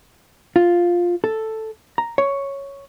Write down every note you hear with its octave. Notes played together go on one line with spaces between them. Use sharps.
F4
A4
A#5
C#5